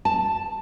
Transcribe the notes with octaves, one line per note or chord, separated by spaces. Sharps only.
A5